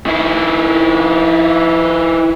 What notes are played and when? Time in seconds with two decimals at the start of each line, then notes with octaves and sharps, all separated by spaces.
0.06 D#3 E4